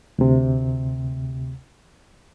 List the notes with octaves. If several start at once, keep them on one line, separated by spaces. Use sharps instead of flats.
D2 C3